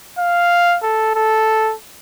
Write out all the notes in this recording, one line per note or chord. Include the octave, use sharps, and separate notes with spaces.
F5
A4
A4